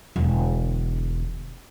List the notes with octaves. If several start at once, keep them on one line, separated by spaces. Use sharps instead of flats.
E1 D3